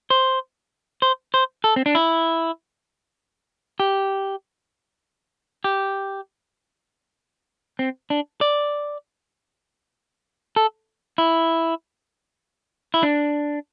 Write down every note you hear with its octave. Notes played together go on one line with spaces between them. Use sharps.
C5
C5
C5
A4
C4
D4
E4
G4
G4
C4
D4
D5
A4
E4
E4
D4